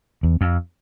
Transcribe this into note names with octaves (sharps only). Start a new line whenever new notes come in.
E2
F2